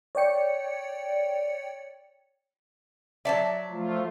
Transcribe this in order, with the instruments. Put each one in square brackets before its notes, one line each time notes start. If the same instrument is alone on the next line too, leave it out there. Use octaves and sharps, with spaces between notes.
[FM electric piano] C#5 D5 G5 C#7
[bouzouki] F#3 D5 [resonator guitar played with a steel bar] E5 A5
[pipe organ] F3 A3 F4